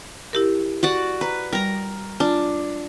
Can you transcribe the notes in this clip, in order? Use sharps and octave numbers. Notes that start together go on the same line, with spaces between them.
E4 G4 A#4
F#4 D5 F#5
B4 A#5
G3 A#4 A#5
D4 F4